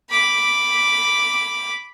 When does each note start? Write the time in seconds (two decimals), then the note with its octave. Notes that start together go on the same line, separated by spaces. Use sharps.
0.10 B5 D6